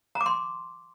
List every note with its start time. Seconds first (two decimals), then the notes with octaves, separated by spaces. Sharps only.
0.15 A#5
0.21 D6
0.26 C6